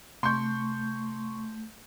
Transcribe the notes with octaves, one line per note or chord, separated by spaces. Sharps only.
C3 A3 C6 C#6 G6